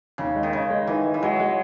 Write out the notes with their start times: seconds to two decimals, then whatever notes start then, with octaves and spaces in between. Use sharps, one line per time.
0.18 D#2 C#3
0.36 G#3
0.43 D#3
0.53 C#3 D#4
0.70 G#3
0.87 D#3 E3
1.05 G#3
1.14 E3
1.22 F#3 G#3
1.40 G#3